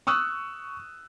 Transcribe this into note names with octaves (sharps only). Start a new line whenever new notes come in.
C#6 D#6 E6 F#6